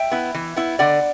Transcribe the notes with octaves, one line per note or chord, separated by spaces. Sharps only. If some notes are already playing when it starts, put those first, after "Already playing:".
Already playing: E5 G5
B3 E4
E3
B3 E4
D3 D5 F#5